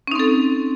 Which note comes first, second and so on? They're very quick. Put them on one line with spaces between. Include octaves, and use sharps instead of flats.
C#4 D#4 C4 A4